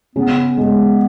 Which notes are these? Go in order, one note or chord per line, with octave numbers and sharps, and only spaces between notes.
C#3 B3
G#3